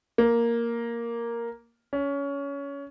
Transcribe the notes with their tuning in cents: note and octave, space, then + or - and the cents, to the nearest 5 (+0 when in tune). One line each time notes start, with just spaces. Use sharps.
A#3 +0
C#4 +20